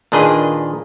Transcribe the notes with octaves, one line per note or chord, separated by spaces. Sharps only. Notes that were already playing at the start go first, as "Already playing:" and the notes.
A#2 D#3 D4 G#4 B4 D#5